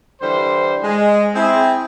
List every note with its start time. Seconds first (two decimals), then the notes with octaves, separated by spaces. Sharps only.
0.22 D3 E3 G3 C5
0.84 G#3
1.35 C4 E4 G#4